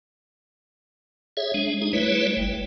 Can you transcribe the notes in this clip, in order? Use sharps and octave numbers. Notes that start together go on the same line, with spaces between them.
G#4 C#5 E5
G#3 D4
D#4 G#4
G3 A3 E4 B4 C#5
G1